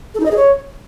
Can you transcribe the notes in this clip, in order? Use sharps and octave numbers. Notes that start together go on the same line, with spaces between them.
A4
D#4
D#5
G#4
C#5